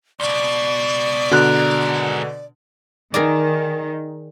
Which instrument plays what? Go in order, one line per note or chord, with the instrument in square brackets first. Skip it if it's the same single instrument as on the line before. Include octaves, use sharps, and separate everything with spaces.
[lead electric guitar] C#2 B2 [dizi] D5
[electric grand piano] B2 D3 [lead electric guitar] G#3 A#4 [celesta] F#4 F#6
[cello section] D#3 [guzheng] G#4 A#4 D5